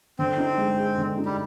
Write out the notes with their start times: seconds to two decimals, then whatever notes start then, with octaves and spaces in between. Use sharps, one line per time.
0.19 D3 C4
0.38 D#4
0.58 G#3
0.78 G#4
0.98 D3
1.18 D#4
1.26 G3